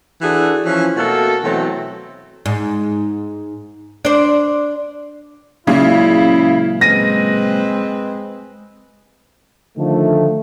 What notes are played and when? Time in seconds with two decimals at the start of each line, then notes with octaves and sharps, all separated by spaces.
0.21 E3 D4 F#4 G#4 A4
0.65 E3 F3 C#4
0.97 B2 A3 A#3 F#4 A4
1.44 B2 E3 F#3 A3 C4
2.46 G#2
4.05 D4 C5
5.67 C#2 A#2 C#3 F#3 E4
6.81 G#3 C4 B4 A#6 D#7
9.78 D3 D#3 F3 A3